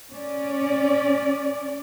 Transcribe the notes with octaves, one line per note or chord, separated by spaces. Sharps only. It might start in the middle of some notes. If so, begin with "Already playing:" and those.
C#4 D5